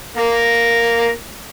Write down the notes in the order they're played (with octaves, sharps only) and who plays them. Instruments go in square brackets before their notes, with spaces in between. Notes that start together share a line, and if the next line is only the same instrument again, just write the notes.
[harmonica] A#3 A#4